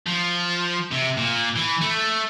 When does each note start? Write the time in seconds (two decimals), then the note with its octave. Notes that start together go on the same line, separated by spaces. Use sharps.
0.06 F3
0.91 C3
1.17 A#2
1.56 E3
1.81 A3